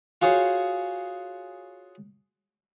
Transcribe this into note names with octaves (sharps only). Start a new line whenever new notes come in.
F4 F#4 G#4 C5 C#5